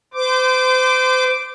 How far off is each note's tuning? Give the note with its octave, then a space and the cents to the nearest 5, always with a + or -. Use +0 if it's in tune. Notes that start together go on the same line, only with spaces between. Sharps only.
C5 -35 D6 +0